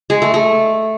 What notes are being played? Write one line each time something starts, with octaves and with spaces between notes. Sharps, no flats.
G#3
A3
A3